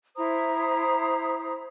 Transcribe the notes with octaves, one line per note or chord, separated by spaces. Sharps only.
E4 C5 A#5 D#6